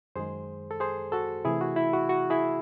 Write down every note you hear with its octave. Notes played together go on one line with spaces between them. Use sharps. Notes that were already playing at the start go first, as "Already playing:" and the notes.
F#2 D#3 G#3 G#4 C5
A4
G#4 C5
F#4 A4
C3 E3 A3 E4 G#4
F#4
E4
F#4
F#4
E4 G#4